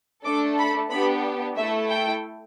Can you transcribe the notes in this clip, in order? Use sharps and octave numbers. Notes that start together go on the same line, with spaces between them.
A3 D4 A4 D6
B5
B3 D4 G4 B5
A3 E4 A4 E5
G5